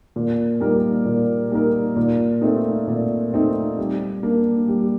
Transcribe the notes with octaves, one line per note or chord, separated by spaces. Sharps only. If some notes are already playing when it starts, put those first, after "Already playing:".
A#2
G3 A#3 D#4 A#4
A#2
G3 A#3 D#4 A#4
A#2
A3 C4 D#4
A#2
A3 C4 D#4
G3
A#3 D4
G3